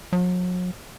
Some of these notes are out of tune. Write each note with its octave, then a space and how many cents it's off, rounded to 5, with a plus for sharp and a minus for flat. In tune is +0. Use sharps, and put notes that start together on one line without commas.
F#3 -40